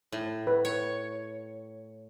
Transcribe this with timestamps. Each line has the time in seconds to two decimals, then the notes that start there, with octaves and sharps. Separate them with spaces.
0.12 A2
0.47 B4
0.65 C#5